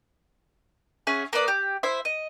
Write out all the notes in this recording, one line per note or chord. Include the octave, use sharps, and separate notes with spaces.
C#4 G#4 E5 F#5
A#3 B4 D5 D#6
G4
E4 C5 E5
D#5